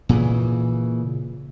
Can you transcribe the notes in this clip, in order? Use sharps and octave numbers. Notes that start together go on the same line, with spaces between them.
A#2 C#3 E3